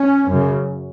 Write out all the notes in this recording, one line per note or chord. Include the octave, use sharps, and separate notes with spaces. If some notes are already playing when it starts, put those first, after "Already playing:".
Already playing: C#4
F#2 C#3